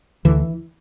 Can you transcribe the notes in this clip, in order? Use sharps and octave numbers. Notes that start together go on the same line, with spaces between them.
D2 D3 E3